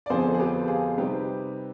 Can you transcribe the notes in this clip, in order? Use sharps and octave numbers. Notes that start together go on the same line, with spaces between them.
D5
F2 D3 F3 B3 G#4 C5
G#4
G4 B4
F4 G#4
C3 G3 C4 D#4 G4 B4